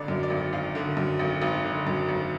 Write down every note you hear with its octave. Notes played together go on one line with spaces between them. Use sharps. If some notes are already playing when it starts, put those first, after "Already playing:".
Already playing: G#1 D3 D5
F#2
D5
G#1
G#1 F5
D3
F#2
G#1
G#1
D3
F#2
G#1